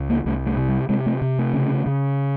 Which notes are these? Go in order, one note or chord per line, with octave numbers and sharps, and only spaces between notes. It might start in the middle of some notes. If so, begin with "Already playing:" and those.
Already playing: C#2
A#3
C2 A3
A3
C3
G3
C3 G#3
A3
C3
A3
C#3
C#3